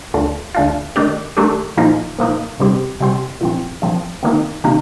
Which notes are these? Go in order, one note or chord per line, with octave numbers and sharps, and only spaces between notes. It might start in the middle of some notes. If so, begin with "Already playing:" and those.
D2 D3 A3 D4 F4
D2 D3 A3 D4 F4
D#3 A3 D4 G4
D#3 A3 D4 G4
A#2 F3 A#3 D#4
A#2 F3 A#3 D#4
C3 G3 C4 G4 C5
C3 G3 C4 G4 C5
A#2 F3 C4
A#2 F3 C4
C3 D#3 A#3 D#4
C3 D#3 A#3 D#4